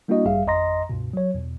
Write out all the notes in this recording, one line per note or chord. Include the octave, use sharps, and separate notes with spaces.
G3 A#3 D4 E4 F#4 D#5
A1 G2 G3 G#4 E5 F5
G#1 F2 D#5 A#5 C6 A#6
C#2 G2 B2
F#3 C#5
E2 B2